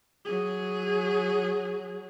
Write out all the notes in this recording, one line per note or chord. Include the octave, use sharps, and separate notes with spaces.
F#3 G#4